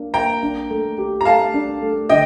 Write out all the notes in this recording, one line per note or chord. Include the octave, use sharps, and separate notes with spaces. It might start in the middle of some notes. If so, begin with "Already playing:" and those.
Already playing: A#3 D4
A#3 G5 A#5
D4
A3
G4
A#5
A3 F5 A5
D4
A3
D3 D#5 G5